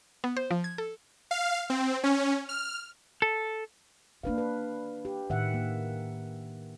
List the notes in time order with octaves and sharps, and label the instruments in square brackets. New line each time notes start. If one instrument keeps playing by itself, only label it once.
[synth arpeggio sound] B3
C5
F3
G#6
A4
[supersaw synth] F5
C4
C#4
F6
[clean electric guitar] A4
[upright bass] D#3 A#3 [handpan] D4 B4 F5
[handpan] B4
G4
[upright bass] A2 [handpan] D#3 E5 F#5
[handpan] A#3